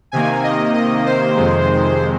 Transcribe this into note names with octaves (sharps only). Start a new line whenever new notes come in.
C3 D#3 A#3 G#5
D#5
D#5
C5
F2 C3 D#3 G#3